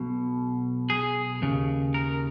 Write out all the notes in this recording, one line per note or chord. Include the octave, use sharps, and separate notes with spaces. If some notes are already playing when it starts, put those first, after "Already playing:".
Already playing: B1 B2
G#4
D#2 C#3
A#4